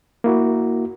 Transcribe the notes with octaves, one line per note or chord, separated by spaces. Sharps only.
A#3 E4 F#4